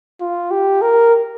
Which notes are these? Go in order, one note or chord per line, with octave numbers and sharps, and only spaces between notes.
F4
G4
A#4